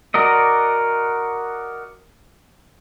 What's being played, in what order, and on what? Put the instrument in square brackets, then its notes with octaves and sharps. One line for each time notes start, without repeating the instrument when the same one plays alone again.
[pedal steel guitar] F#4 A#4 D5 D#5